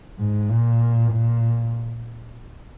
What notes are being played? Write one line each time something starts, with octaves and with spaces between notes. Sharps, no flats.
G#2
A#2
A#2